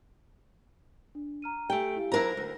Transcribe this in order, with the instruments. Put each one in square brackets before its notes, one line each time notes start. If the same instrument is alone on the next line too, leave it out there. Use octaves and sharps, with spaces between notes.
[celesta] D4
A#5 F6 D#7
[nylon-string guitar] A3 G5 [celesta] G4 G#5 D7
[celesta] E4 G4 F5
[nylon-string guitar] F#3 D4 E4 [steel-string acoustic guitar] A#4 A#5 [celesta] C5
[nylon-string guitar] D2